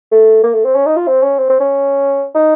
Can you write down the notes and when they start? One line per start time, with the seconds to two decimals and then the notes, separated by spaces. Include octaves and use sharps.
0.12 A3
0.43 A#3
0.54 A3
0.65 C4
0.75 C#4
0.86 D#4
0.97 F4
1.08 C4
1.23 C#4
1.39 C4
1.50 C4
1.60 C#4
2.35 D#4